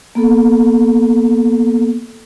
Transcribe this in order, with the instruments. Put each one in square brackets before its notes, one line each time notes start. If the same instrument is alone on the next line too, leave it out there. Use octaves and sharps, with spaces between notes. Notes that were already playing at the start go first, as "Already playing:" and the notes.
[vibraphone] A#3 B3 A4